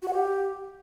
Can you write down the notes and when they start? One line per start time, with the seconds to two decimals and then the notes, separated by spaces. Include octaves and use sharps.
0.02 F#4
0.08 F#5
0.13 G4